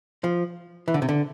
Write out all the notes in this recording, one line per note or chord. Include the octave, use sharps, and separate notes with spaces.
F3
E3
D3
C3
D3